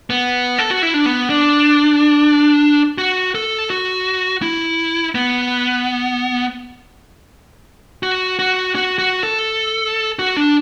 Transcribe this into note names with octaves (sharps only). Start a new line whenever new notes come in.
B3
A4
F#4
E4
D4
B3
D4
F#4
A4
F#4
E4
B3
F#4
F#4
F#4
F#4
A4
F#4
D4